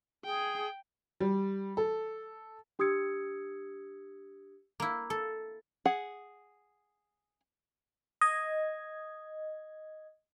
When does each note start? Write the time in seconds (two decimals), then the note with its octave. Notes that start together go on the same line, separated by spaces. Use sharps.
0.25 G#4 G5
1.20 G3
1.77 A4
2.79 D4 G4 D#6 E6 G#6 C#7
4.80 A#3 E4
5.10 A4
5.85 G#4 F#5
8.21 D#5 G#6